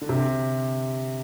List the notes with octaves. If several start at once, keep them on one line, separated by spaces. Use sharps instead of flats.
D3
C3